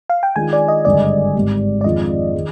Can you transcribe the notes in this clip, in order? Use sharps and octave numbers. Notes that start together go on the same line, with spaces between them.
F5
G5
D#3 G#3 D4 F4 G#5
D5
D#5
G#1 G2 D3 G#3 D5
G#1 G#2 G3
D5
F2 D#3 G#3 D4 F4 D#5
D#3 G#3